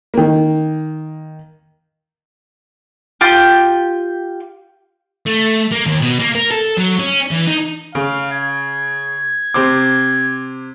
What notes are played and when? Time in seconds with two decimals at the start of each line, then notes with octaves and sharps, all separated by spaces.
0.14 D#3 A#3
3.21 F4 G4
5.27 A3
5.72 A#3
5.86 D#2
6.01 B2
6.19 A#3
6.35 A#4
6.51 A4
6.78 F#3
7.00 C#4
7.31 E3
7.47 D#4
7.95 C#3 F5
8.32 G#6
9.54 C3 C5 D6